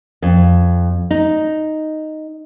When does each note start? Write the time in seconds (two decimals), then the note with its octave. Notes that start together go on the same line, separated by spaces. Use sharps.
0.22 F2
1.11 D#4